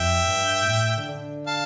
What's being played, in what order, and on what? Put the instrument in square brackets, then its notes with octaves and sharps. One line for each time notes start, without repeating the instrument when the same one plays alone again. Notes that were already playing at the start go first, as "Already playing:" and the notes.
Already playing: [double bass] F2 [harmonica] E5 G5
[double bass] G2
A2
D3
[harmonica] F5 A5